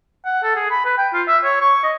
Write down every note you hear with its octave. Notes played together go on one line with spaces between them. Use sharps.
F#5
A4
G#4
B5
B4
G5
F4
E5
C#5
C#6
D#5